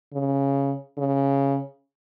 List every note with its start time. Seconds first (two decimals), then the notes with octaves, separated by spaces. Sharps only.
0.13 C#3
0.98 C#3